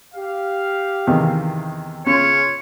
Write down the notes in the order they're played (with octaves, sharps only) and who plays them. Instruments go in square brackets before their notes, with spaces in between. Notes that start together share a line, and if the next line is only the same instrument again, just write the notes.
[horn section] G4 F5
[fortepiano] E2 C3 D#3
[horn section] C#3 F4 [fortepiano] C#4 [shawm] C#5